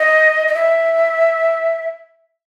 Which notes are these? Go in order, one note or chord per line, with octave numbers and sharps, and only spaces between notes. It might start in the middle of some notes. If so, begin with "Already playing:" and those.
Already playing: D#5
D#5
E5